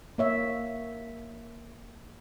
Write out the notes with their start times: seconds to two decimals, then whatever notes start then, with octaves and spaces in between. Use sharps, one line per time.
0.18 A#3 C#5 E5